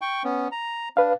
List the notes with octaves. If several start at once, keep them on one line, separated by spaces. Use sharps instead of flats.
G5 C#6
B3 C#4
A#5
D4 B4 F5